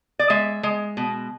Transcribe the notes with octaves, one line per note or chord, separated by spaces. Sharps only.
D5
G#3 E5
G#3
B2